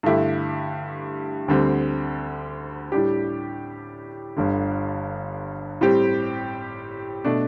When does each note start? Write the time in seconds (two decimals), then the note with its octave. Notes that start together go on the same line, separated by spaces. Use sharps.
0.03 G2 D3 A3 E4 G4
1.48 D2 D3 G3 C4
2.92 A2 G3 D4 G4
4.37 G1 G2 D3
5.81 A2 G3 C4 G4
7.24 B2 A3 D4